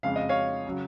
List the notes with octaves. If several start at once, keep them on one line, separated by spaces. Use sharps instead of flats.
F2 C#3 G#3 F5
D#5
C#5 F5
C#3 F#3